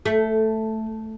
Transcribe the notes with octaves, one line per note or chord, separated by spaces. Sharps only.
A3